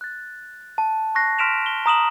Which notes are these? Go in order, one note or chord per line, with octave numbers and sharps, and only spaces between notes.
F#6 A6
A5
C#6 F#6 A#6 C7
C6 F6 B6 D7 E7 F7
G7
A#5 D#6 E7 F#7